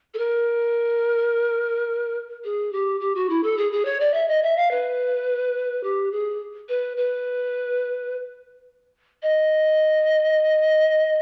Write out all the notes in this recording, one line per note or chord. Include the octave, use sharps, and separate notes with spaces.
A4
A#4
G#4
G4
G4
F#4
E4
A4
G#4
G#4
C#5
D5
E5
D#5
E5
F5
B4
G4
G#4
B4
B4
D#5